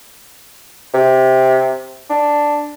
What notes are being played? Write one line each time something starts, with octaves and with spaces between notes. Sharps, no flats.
C3
D4